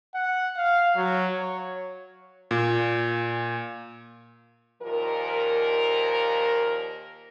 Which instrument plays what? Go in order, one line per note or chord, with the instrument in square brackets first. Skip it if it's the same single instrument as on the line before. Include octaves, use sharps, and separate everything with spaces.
[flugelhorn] F#5
F5
F#3
C#5
[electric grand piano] A#2
[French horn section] D#2 A#2 F3 A#4